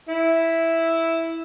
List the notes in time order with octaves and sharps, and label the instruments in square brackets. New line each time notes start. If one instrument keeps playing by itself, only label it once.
[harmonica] E4